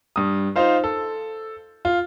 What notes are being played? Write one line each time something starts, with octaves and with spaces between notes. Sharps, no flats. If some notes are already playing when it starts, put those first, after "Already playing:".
G2 D#6
D#4 F4 C5 F5
A4
F4